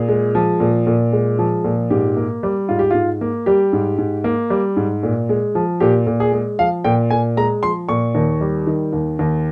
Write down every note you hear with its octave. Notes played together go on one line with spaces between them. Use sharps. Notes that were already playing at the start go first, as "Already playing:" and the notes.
Already playing: A#2 G#4
G#3
F3
A#2
A#2
G#3
F3
A#2
G#2 G4
A#3
G3
G#2 F4
G4
G#2 F4
A#3
G3 G4
G#2
G#2
A#3
G3
G#2
A#2
G#3
F3
A#2 G4
A#2
G#4
G#3
F3 F5
A#2 G5
A#2 G#5
G#3 A#5
F3 C6
A#2 C#6
D#2
G3
D#3
D#2
D#2